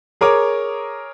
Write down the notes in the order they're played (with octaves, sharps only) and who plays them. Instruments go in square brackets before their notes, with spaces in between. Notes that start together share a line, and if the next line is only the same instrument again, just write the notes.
[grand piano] G#4 A#4 C#5 D6